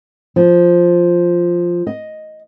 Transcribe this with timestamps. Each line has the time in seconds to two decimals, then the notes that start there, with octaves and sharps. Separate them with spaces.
0.36 F3
1.87 D#5